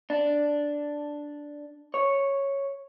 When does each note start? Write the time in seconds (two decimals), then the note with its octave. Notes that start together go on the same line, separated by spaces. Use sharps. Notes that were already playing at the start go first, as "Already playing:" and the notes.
0.10 D4
1.94 C#5